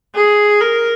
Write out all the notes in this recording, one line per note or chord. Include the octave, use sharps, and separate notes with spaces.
G#4
A#4